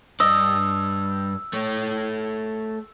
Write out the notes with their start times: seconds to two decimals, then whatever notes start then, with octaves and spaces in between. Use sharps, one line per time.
0.20 G2 D5 D#5 E6
1.53 A3 C#5